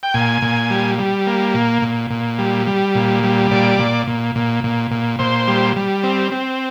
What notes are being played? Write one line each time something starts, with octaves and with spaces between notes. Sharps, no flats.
G5
A#2 G#5
A#2
G3
G3
A#3
A#2
A#2
A#2
G3
G3
A#2
G3
A#2 D5
A#2
A#2
A#2
A#2
A#2
A#2 C5
G3
G3
C4
C4